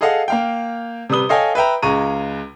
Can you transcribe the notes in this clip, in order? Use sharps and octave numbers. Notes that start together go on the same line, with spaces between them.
G#4 A4 D#5 F5 F#5
A#3 F5 G5
C3 G3 B4 D#6 G7
A4 C#5 D#5 F5 G5 G#5
B4 E5 G5 A#5
C#2 C#3 G#3 A#5 C#6 D#7